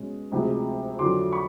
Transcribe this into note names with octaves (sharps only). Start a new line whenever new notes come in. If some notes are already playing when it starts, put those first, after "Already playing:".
Already playing: B2 G#3 C#4
D2 C3 F3 G#3 C4
F2 D3 F#3 C6 D6
B5 C#6